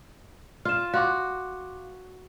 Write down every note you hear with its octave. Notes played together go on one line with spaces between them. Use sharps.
F4 F6 E7
F#4 F5 C6 D6